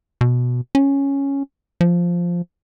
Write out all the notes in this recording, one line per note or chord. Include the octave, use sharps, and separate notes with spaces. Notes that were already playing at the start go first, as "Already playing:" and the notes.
B2
C#4
F3